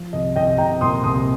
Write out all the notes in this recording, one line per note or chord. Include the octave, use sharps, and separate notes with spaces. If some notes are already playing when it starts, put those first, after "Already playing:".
Already playing: F3
C2 D#5
C2 D#5 G5
C2 G5 A#5
A#2 C6 D#6
C2 C6 D#6